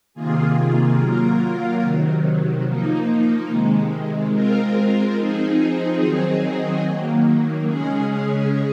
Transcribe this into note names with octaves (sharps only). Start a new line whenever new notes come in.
C3 D#3 A#3 F4 G#4
F#3 A#3 F4 A#4
C3 D#3 F#3
F3 A#3 D#4
C3 D#3 G#3
G#3 C4 F4 A#4
F3 C4 D#4 G#4
D#3 F#3 C4 D#4 G#4
D#3 F#3 A#3
C#3 G#3 C#4 G#4